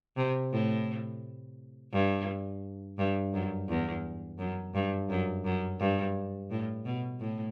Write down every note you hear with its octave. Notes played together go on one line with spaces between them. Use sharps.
C3
A2
G2
G2
F#2
E2
F#2
G2
F#2
F#2
G2
A2
B2
A2